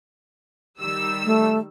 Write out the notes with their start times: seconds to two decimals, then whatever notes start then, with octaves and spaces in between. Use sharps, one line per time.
0.79 D#3 G3 E6
1.25 A3